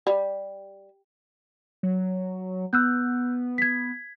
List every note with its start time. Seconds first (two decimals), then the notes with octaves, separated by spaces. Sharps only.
0.07 G3
1.83 F#3
2.73 B3 E6 F#6 G6
3.58 G#6 B6